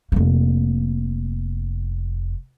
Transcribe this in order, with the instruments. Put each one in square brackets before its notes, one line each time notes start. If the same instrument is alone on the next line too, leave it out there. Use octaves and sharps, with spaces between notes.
[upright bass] F1 A#3